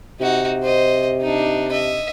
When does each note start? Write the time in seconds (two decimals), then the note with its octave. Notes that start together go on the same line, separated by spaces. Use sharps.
0.20 C3 D#4 F#4
0.63 C5 D#5
1.21 D4 D#4
1.72 D#5 E5